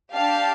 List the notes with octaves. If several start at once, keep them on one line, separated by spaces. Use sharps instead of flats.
D4 G4 F5 A5